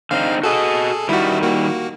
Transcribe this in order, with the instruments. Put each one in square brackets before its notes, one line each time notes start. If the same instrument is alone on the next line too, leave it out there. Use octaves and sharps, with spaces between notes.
[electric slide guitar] D3 C4 D#4 [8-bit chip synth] F5
[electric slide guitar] F#4 D#5 [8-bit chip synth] G#4 A4
[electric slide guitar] D#3 G3 [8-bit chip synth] E4 F#4
[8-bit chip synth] A#3 F#4